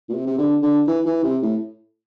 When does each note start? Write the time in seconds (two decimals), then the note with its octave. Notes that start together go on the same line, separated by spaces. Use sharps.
0.09 A#2
0.14 C3
0.26 C3
0.38 D3
0.62 D3
0.87 E3
1.06 E3
1.24 C3
1.42 A2